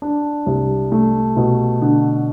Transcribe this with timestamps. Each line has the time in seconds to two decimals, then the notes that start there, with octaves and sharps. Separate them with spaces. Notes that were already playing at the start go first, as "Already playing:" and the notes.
0.02 D4
0.46 C2
0.92 A3
1.37 B2
1.82 D3